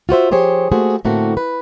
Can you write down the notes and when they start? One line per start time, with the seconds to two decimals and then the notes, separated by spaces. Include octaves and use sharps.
0.09 F4 F#4 C5 E5
0.31 F3 G4 G#4 C5 C#5
0.72 A3 A#3 F#4 G#4 C5
1.05 A2 D3 A3 A#3 C4 F#4
1.37 B4